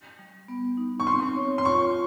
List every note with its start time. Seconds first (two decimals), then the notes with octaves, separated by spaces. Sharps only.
0.19 G3
0.48 B3
0.77 D#4
1.00 C#6
1.07 C4 C6
1.36 C#5
1.58 C6
1.65 F4 C#6